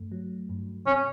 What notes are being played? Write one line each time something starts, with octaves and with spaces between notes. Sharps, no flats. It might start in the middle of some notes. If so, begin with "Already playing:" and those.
Already playing: G2 A3
F#3
G2
C3 C#4